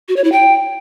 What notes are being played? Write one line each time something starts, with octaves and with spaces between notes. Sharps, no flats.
F#4
C#5
E4
G5